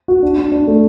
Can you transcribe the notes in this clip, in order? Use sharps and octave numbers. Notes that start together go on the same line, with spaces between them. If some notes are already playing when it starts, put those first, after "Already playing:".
F#4
D4
D4
D4
A3